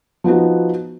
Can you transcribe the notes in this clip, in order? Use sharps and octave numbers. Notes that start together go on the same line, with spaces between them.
F3 B3 D#4 F#4